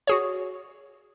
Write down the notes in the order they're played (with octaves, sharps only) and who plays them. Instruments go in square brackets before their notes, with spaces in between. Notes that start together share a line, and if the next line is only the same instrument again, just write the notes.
[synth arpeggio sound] F#4 G#4 C#5